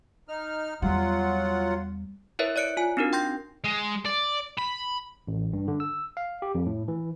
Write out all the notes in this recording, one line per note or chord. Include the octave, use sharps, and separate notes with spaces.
D#4 F6
E2 F#3 G3 F4 F#5
E4 A#4 B4 C#5 E5
C#5 D5 F#6 C#7 D7
F4 G#5
C4 D4 D#4 F#4 A#4
G5 C6 G6 A#6
G#3
D5
B5
A1
G2
D3
E6
F5
G4
F2
A2
E3